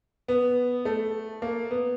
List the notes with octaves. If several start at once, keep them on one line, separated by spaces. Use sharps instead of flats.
B3
A3
A#3
B3